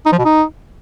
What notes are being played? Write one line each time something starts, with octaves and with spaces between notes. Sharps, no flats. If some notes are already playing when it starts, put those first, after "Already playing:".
D#4
F3
B2
D#4